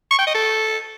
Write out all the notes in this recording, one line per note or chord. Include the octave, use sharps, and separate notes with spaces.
C#6
G5
D#5
A4